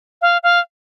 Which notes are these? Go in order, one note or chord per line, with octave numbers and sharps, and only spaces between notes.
F5
F5